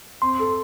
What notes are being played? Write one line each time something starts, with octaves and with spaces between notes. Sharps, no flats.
C4 C6
A4